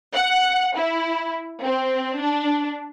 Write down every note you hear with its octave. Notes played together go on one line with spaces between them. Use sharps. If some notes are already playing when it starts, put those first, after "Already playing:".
F#5
E4
C4
D4